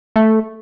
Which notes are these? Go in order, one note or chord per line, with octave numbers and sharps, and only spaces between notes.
A3